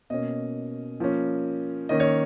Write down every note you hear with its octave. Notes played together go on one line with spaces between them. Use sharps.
B2 A#3 C#4 D#5
F3 A#3 C#4
D#3 A#3 C#4 D#5
C#5